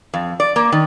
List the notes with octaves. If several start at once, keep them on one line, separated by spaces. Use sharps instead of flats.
F2
D5
A#3
D#3